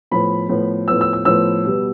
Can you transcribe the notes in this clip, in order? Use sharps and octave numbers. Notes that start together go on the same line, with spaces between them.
A2 F3 B3 B5
A2 F3 B3
A2 F3 B3 E6
E6
E6
A2 F3 B3 E6
B2 G3 B3